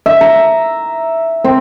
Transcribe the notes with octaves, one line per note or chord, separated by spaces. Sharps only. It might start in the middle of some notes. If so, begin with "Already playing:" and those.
E5
A#5
C4